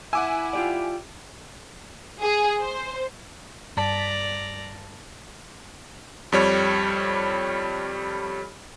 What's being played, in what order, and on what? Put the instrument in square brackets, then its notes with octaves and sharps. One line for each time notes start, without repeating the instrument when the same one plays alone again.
[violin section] E4 [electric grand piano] F#5 D6 E6 [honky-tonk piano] G#5
[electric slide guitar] F4 G4 D5
[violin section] G#4
C5
[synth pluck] G2 A5 B6 [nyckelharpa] D5 A#5
[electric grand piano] F2 G3 C#5